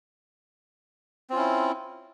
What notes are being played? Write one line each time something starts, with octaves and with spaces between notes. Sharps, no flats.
C4 C#4 E4 F4